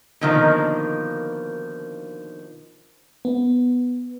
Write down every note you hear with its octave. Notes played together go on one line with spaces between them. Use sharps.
B2 D3 D#3 F3 G3 A#3
B3